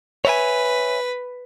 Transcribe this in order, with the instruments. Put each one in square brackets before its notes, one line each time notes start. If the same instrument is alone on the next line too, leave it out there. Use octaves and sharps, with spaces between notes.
[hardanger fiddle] B4 [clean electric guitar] C#5 E5 G#5